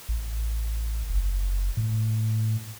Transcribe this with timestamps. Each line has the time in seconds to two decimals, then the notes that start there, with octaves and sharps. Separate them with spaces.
0.09 A1
1.10 F#1
1.77 A2